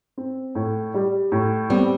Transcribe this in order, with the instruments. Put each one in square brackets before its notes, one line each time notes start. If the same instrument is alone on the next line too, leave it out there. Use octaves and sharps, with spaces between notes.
[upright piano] C4
A2
G3
A2
[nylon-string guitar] G3 B3 [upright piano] C4